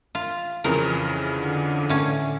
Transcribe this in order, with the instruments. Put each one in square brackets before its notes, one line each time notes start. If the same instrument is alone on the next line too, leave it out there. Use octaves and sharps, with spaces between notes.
[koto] F4
[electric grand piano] F2 C#3 E3 [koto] A#4
[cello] D3
[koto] A2 C#4